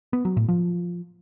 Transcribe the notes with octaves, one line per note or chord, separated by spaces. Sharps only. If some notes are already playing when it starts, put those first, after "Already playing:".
B3
F#3
A2
F3